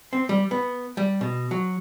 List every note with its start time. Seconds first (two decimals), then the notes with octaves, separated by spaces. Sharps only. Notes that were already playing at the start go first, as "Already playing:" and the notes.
0.13 C4
0.29 G3
0.51 B3
0.97 G3
1.21 B2
1.51 F#3